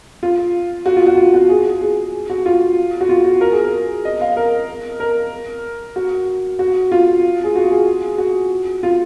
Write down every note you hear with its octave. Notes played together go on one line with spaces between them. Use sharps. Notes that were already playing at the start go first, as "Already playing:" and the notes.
F4
F#4
F4
F#4
F4
F#4
G#4
G#4
F#4
F4
F#4
F4
F#4
A#4
G#4
A#4
D#5
F5
A#4
A#4
F#4
F#4
F4
G#4
F#4
G#4
F#4
F4